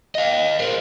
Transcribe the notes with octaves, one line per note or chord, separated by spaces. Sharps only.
D#5 F5
A#4 C5